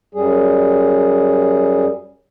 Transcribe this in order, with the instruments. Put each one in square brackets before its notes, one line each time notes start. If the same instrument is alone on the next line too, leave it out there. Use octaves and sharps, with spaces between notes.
[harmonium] F#2 G3 G#4